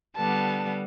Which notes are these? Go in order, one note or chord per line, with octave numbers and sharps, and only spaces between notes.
D3 G3 B3 A5